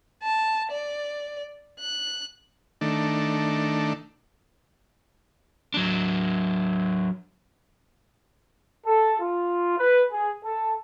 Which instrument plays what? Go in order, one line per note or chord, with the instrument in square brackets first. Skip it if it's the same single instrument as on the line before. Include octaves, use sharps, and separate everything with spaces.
[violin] A5
D5
F#6
[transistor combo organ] D#3 A3 D4
[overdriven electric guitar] F#3 D4
[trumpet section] A4
F4
B4
G#4
A4